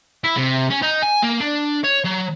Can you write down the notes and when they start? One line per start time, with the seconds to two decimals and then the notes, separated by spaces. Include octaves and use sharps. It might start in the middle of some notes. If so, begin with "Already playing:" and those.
0.24 E4
0.37 C3
0.70 C#4
0.82 D#4
1.03 G#5
1.23 A#3
1.41 D4
1.84 C#5
2.05 F#3